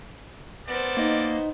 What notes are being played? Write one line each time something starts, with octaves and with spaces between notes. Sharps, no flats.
B3 A4 A#4 C5 D5
A#3 D#4 D#5